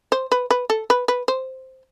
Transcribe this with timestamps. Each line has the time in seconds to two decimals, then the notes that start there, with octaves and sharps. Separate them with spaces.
0.12 C5
0.32 B4
0.51 B4
0.70 A4
0.90 B4
1.08 B4
1.28 C5